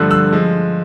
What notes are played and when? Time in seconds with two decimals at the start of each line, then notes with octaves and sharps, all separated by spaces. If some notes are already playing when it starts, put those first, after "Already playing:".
Already playing: G2 D3 F3 A3 E6 F#6
0.11 E6 F#6
0.33 F3 G#3